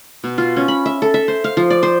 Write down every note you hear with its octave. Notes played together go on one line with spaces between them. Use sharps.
B2
F4
C#4
B5
E5
A4
E5
C5
F5
F3
D5
C5